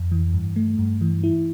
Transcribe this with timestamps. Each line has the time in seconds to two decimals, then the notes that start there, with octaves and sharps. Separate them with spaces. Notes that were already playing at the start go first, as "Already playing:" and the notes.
Already playing: F2
0.11 E3
0.34 G2
0.56 A3
0.79 G2
1.01 E3
1.23 E4